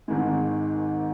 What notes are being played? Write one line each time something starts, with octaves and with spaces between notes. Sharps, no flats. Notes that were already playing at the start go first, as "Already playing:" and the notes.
G#1 G#2 D#3 G#3